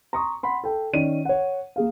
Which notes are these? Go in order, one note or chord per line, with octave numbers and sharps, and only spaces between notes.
A#5 C6 C#6 D#6
F#5 B5 C6
A4 G5
D#3 C#4 D5 D#7
C#5 F#5
A#3 G#4 F5